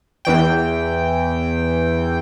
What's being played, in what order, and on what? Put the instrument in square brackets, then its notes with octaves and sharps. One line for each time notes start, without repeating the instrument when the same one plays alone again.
[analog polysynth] E2 E3 G5